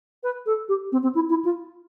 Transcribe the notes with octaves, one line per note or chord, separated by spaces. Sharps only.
B4
A4
G4
C4
C4
E4
E4
F4